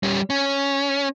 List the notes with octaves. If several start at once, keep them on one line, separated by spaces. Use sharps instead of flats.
G3 C#4
C#4